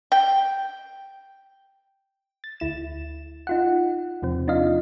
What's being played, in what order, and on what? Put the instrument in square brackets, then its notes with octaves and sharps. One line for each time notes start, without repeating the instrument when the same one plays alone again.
[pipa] G5
[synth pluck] A6
D2 E4 E7
D#4 F4 F#5
E2 C3 F3 C4
D4 D#4 F4 D#5 F5